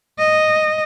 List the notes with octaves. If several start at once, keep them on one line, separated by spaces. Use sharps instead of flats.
D#5